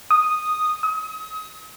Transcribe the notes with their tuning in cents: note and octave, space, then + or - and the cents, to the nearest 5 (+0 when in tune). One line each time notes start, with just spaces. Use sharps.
D#6 -5
D#6 +35